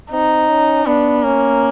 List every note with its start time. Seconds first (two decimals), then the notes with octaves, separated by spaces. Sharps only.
0.11 C4 D#4
0.49 C#4
0.86 B3 D4
1.24 A#3 C#4